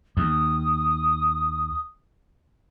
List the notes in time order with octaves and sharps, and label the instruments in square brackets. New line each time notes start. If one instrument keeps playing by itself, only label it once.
[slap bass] D#2 [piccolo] D#6